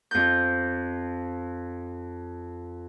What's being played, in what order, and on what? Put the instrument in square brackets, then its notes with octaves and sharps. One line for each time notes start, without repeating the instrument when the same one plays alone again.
[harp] F2 G6